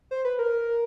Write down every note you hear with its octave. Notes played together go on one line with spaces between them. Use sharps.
C5
B4
A#4